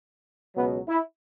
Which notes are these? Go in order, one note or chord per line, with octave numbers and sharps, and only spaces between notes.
C#2 B2 F#3 B3
E4